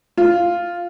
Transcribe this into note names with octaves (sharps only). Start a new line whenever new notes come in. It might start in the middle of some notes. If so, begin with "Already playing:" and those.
F4